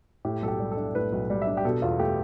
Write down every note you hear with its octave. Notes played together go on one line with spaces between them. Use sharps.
A2 G4
B1 A4
G4
G3
A4
D4
A2 B4
B1
G3
E5
D4
G4
B2 A4
E2 F4
A3 G4